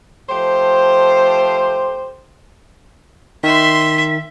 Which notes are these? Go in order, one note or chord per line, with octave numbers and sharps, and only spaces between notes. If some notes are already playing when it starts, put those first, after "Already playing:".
F3 A3 G4 C5
D#3 E5 C6 B6